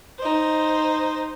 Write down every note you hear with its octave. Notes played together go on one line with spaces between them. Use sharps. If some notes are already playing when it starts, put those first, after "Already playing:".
D#4 C5